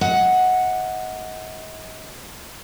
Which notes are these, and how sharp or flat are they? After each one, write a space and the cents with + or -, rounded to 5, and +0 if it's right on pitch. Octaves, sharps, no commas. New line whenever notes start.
D#5 +35 F#5 -5